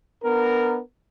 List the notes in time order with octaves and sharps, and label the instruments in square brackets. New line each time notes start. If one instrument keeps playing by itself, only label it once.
[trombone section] B3 D4 A#4